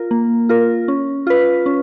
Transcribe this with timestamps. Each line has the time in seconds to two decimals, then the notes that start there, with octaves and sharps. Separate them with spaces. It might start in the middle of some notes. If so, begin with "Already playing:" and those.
Already playing: F4 A#4
0.11 A#3
0.49 F4 A#4
0.88 C#4
1.27 F4 B4
1.66 C#4